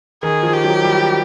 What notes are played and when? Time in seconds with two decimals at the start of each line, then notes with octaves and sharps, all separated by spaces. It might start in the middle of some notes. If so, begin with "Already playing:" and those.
0.23 D#3 G#4
0.43 F3
0.53 G4
0.64 F#3
0.84 G3